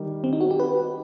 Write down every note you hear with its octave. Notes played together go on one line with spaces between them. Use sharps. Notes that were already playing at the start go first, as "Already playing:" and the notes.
Already playing: D#3 G3 D#4
C4
D#4
F#4
G4
B4